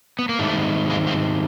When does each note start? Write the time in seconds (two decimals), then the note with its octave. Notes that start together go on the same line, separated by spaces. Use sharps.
0.19 B3
0.29 A#3
0.39 G#2 D#3 G3 A3
0.90 G#3 A#3
1.07 A#3 C4